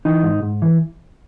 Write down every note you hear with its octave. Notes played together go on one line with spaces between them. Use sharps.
E3 D#4
G#2
G#2
E3